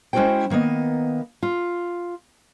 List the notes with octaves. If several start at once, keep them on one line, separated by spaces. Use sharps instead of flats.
G#3 C#4 E4 F#4 C5 G5
D#3 A#3 B3 D#5
F4